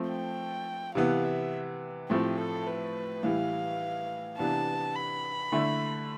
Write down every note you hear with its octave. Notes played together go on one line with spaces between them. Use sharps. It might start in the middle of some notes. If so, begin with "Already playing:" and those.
Already playing: F3 A3 C4
G5
C3 E3 B3 F5
E5
A2 F3 A3 C4 G4
A4
B4
A2 E3 G3 F5
C3 E3 B3 D4 A5
B5
D3 A3 E4